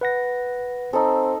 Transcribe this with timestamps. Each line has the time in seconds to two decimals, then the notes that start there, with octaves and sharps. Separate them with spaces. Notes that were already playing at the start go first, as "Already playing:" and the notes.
0.01 B4 F#5 A#6
0.93 C4 D#4 A4